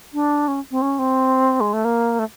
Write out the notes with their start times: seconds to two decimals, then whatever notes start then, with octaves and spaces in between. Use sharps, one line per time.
0.14 D4
0.48 C#4
0.71 C4
0.82 C#4
0.99 C4
1.60 G#3
1.73 A3
1.85 A#3
2.19 A3